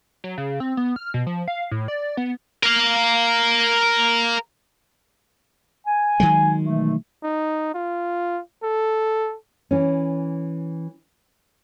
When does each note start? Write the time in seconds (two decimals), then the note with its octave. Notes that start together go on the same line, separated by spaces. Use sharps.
0.24 F#3
0.38 C#3
0.60 C4
0.77 B3
0.96 F6
1.14 B2
1.27 F3
1.48 F5
1.71 A2
1.88 D5
2.17 B3
2.63 A#4 F5
5.87 G#5
6.20 D#3 F#3 G#3
6.65 B2 E3 A3
7.23 D#4
7.74 F4
8.63 A4
9.71 E3 C#4